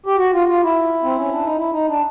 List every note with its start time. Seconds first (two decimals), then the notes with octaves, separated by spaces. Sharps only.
0.06 G4
0.17 F#4
0.33 F4
0.48 F4
0.63 E4
1.03 C4
1.17 C#4
1.31 D4
1.43 D#4
1.57 E4
1.72 D#4
1.88 D4